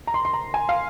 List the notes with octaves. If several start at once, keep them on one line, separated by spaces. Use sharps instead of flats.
A#5
C6
C6
A#5
G#5
F5